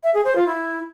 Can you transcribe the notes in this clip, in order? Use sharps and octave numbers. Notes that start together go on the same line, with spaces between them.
E5
G#4
C5
F4
E4